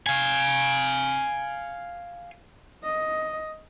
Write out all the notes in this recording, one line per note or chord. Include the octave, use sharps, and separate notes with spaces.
F5 G#5
D#5